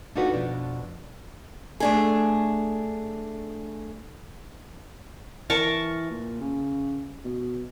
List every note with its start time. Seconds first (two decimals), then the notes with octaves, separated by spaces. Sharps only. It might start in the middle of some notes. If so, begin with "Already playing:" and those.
0.16 D4 D#4 F4 F#4 A4 B4
0.33 F2 B2 D4
1.80 A3 D4 G#4
5.50 E3 A#4 A5 C#6
6.11 A#2
6.41 C#3
7.25 B2